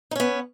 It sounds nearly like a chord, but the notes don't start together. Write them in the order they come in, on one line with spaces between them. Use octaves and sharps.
D#4 C#4 B3